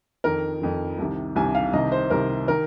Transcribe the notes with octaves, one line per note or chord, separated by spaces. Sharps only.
F2 D#3 A#4
F2 D#3
C2 C3 D#3
C2 C3 D#3 G#5
F5
C2 C3 D#3 D#5
C5
C2 C3 D#3 A#4
D#3 A#4